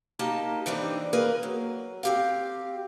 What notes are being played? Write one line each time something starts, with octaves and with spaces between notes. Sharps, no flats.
A#3 D#4 G4 A5
G2 E3 C4 D4 D#4
A#3 G#4 A#4 B4
F#3
C4 G4 F5